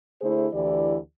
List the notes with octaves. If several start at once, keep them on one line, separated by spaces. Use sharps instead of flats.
D3 A3 E4 G#4 C5
D2 E3 E4 G4 D5